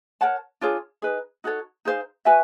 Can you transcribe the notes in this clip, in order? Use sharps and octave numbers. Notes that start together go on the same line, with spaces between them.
A#4 C#5 F#5 A5
D4 F4 G#4 C#5
D#4 G#4 B4
D#4 F#4 A4 C#5
D#4 G#4 C5 F5
F#4 B4 E5 G#5